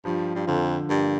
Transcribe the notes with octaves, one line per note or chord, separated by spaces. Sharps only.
G2 F3
G2
F2 D3
G2 A#3